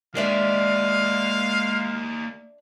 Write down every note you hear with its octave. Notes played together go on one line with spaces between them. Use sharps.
G#3 A#3 D4 G4 D5 E5 F5